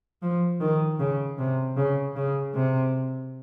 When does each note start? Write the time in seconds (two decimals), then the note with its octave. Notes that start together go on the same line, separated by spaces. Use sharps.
0.22 F3
0.60 D#3
0.99 C#3
1.38 C3
1.77 C#3
2.16 C#3
2.54 C3